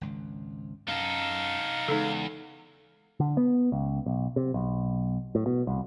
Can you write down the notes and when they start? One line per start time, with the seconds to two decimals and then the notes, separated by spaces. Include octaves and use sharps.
0.01 G#1 C#2
0.88 F#2 D#4 A4 F5
1.88 E2 C#3 G#3 D#4 A4
3.20 D3
3.37 B3
3.72 C#2
4.06 B1
4.36 C3
4.54 B1
5.35 A2
5.46 B2
5.67 C2